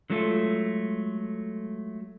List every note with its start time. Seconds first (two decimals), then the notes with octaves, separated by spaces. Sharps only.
0.10 D3 F#3 G#3 A3 F4 A4